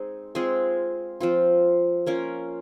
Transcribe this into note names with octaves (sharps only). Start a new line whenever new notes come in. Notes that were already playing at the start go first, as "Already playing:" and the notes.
Already playing: G#3 C4 D#4 G#4
G#3 C4 F4 G#4
F3 C4 F4
A#3 C#4 F4 A#4